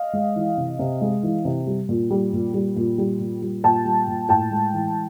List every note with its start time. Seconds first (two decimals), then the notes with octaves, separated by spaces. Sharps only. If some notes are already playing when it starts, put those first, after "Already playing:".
Already playing: D#5 F5
0.13 G#3
0.36 E3
0.57 C3
0.79 C3
1.01 G#3
1.23 E3
1.45 C3
1.67 G3
1.89 A#2
2.11 G3
2.33 A#2
2.54 G3
2.76 A#2
2.98 G3
3.20 A#2
3.42 G3
3.64 A#2 G5 A5
3.85 G3
4.07 A#2
4.29 A2 G5 A5
4.51 G#3
4.73 E3